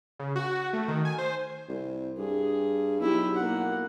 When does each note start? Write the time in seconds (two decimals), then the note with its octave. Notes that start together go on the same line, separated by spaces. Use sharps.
0.20 C#3
0.36 F#4
0.73 A3
0.88 D#3
1.05 G#5
1.18 C5
1.69 C2
2.18 G2 G#4
3.01 B1 E4 G4
3.37 A#3 F#5